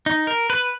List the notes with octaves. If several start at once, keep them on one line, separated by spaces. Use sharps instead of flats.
D#4
A#4
B4